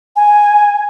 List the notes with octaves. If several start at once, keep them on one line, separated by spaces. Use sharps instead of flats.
G#5